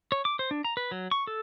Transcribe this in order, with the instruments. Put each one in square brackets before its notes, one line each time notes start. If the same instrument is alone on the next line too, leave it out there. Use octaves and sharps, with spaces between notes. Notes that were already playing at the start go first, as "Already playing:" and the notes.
[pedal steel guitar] C#5
D6
C5
D4
A#5
B4
F#3
C#6
A4